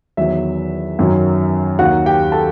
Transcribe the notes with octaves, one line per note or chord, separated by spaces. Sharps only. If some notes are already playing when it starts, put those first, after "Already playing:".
E2 D#3 F#3 E5
F#2 D#3 F#3
D#2 D#3 F#3 F#4 F#5
G4 G5
A4 A5